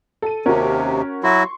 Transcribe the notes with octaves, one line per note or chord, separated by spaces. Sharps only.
A4 D#7
D#2 C3 C#4 F#4 A#4
F#3 E4 F#4 C6 C#6